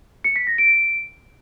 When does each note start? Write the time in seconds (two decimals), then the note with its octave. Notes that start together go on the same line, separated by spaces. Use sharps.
0.24 C#7
0.36 B6
0.47 A#6
0.58 D7